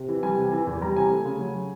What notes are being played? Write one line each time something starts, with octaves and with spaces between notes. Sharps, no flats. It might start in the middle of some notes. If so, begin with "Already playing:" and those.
Already playing: C3
E3
G3 G#5
C3 G#5
E3 G#5
E2
G3 A#5
C3 G#5
A3
C#3
F#3